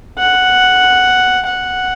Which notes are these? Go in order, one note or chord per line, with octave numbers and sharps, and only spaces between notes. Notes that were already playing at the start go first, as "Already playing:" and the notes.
F#5
F#5